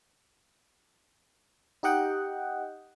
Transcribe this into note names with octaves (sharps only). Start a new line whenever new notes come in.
D#4 G4 D#5 F#5 G5